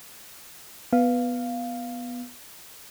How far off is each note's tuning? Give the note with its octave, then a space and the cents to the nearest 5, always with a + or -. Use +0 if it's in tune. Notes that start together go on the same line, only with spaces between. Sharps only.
B3 +0 F5 +0